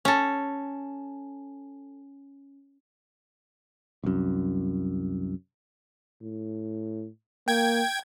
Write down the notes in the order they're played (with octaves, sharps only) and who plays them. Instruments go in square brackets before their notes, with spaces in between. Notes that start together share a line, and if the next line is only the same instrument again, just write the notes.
[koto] C#4 A4
[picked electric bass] C2 F#2
[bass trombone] A2
[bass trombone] A#3 [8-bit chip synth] G5 G#6